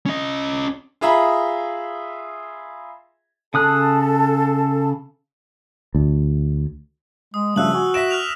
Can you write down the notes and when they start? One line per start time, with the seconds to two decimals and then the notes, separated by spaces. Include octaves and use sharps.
0.06 C#4 D#5
1.01 F4 G#4 E5 A#5 B5
3.54 C#3 A4 A5 D#6 F#6
5.95 D2
7.34 G#3 D#6
7.56 G2 C#3 F3 A3 E6 F#6 F#7
7.74 F#4 G#5
7.94 E5 A#6 B6 D7 E7
8.11 F6 F#6 F7